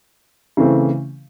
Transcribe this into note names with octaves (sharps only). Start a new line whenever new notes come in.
C#3 E3 A3 C4